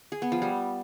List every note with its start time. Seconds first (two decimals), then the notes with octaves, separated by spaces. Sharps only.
0.12 G#4
0.22 B3
0.32 F3
0.42 G3